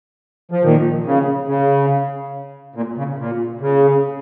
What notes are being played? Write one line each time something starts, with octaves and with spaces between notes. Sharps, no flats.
F3
A#2 D#3
C#3
C#3
A#2
C#3
A#2
C#3